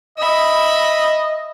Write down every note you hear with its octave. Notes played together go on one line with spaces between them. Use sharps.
D#5 E5 B5